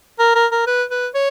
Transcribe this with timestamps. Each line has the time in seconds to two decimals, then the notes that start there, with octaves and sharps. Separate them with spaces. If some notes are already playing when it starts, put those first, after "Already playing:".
0.19 A#4
0.35 A#4
0.52 A#4
0.67 B4
0.91 B4
1.15 C#5